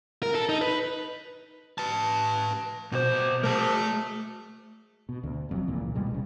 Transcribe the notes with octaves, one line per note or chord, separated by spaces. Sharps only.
A#4
A4
D#4
B4
B4 A5
C2 B2 C5
A3 G#4 A#4 A5
B2
D2
F1 F2 F#3
C#2 A#2 E3
F2 B2 G3 G#3
F1 C#3